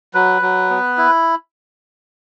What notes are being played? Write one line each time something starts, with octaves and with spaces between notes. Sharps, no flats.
F#3 B4
F#3
B3
E4